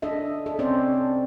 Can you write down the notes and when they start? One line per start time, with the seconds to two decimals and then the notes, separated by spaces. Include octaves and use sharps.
0.02 D4 A4 D#5 E5
0.46 A4
0.59 C4 C#4 C5 D5